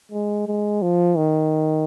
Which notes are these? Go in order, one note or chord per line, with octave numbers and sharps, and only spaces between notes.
G#3
G#3
F3
D#3